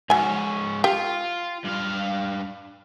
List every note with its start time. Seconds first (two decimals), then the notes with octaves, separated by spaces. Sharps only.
0.10 G#2 F#3 C#4 G#5
0.84 F4 G4 G5
1.65 G2 F5